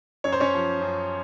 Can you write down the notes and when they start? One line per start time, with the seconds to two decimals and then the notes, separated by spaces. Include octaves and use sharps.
0.24 F#2 C#5
0.33 C5
0.40 C#4 C#5
0.54 F3
0.81 F#2